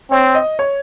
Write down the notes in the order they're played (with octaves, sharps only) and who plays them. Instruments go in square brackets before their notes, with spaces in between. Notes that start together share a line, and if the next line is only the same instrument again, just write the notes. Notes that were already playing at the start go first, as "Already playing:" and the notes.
[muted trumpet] C4 [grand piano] C#5
[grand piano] D#5
C#5